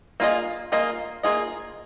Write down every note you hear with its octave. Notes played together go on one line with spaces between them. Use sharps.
A#3 F4 G#4 D#5
A#3 F4 G#4 D#5
A#3 F4 G#4 D#5